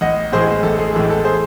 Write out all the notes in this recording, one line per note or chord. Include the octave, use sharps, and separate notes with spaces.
A1 D#5 F#5
A2 E3 G#3 G#4 C5
A1 A4
G#4
A2 E3 G#3 A4
A4
G#4 C5